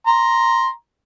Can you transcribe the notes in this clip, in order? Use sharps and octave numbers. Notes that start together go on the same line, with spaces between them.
A#5 C6